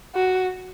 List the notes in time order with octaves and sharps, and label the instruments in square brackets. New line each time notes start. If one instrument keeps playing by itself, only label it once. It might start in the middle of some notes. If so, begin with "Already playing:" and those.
[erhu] F#4